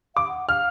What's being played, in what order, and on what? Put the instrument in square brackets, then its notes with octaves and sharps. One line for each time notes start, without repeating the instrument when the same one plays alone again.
[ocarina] F5 [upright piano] D6
[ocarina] F#5
[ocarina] F5 [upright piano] F6